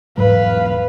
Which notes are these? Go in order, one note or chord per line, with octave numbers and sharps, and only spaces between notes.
E1 G#2 F#3 B4 F5